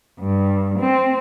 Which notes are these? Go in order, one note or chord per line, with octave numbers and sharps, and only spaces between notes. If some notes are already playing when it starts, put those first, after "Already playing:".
G2
C4